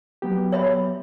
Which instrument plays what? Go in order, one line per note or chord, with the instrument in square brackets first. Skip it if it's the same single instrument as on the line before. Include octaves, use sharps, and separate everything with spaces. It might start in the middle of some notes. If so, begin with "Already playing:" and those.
[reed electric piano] F#3 B3 G4
[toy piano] C#5 E5 B5